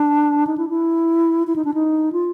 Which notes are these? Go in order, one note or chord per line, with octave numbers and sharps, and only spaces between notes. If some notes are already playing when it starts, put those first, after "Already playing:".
Already playing: D4
D#4
E4
E4
E4
D#4
D4
D#4
F4